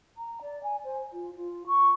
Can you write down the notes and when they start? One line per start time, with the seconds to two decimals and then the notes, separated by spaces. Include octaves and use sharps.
0.18 A#5
0.42 D5
0.63 G#5
0.85 C5
1.13 F4
1.35 F4
1.67 C#6